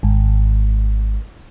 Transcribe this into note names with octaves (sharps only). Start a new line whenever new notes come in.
G#1